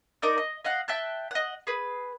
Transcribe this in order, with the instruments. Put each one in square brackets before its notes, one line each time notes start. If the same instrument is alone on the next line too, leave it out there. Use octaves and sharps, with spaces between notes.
[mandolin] D#4 A#4 D5 G6
D#5
D#5 F5 F#5
E5 G5 A5 F#6
D#5 F#5
G#4 B4